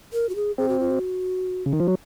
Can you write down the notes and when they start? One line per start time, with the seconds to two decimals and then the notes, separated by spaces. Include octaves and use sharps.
0.13 A#4
0.29 F#4
0.35 G#4
0.58 C4 G#4
0.68 F#4
0.80 F4
0.90 F#4
1.66 C#3
1.73 D#3
1.80 F3
1.88 F#3